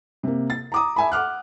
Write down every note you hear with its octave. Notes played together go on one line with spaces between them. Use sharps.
C3 A#3
A6
A#5 D6 D#6
E5 G#5 B5
F#5 D6 F6 F#6